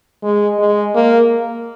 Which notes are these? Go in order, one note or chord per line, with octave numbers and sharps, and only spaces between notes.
G#3
G#3
A#3